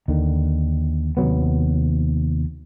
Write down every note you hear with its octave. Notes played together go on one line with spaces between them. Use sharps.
D#2 D3 D#3
D#2 C3 F#3 B3